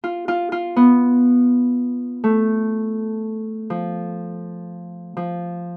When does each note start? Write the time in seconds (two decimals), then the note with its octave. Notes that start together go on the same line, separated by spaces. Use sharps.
0.04 F4
0.28 F4
0.52 F4
0.76 B3
2.24 A3
3.70 F3
5.17 F3